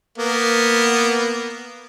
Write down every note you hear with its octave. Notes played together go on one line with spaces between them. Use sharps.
A#3 B3